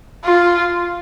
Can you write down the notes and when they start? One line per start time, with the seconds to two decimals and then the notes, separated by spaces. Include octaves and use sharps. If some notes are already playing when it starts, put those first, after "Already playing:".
0.24 F4